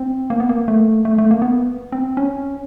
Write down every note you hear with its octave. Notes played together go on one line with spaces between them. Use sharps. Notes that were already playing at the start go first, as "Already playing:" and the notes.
Already playing: C4
A#3
B3
A#3
A3
A3
A3
A#3
B3
C4
C#4